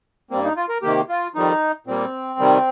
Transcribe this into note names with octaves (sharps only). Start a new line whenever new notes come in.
G2 G3 A#3 C4
D#4
F4
A#4
C3 D#3 A#3 G4
F4
F2 D#3 G3 D#4
A#2 G3 A#3 C4
C3 D#3 G3